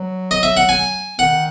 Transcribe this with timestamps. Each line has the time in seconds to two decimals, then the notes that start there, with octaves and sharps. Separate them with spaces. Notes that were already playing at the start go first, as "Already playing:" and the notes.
Already playing: F#3
0.31 D#5
0.43 E5
0.57 F#5
0.69 G#5
1.19 D#3 F#5